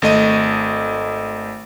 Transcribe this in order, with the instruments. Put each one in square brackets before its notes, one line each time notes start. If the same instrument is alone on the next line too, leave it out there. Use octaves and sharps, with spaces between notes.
[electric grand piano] G#1 A3 D#5 D#7